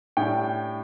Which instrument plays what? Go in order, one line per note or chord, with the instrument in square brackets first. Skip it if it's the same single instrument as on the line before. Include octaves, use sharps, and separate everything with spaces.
[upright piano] A2 G3 D4 G5